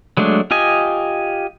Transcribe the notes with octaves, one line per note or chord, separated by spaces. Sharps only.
F#3 G#3 A3 D4
F4 G4 D#5 G#5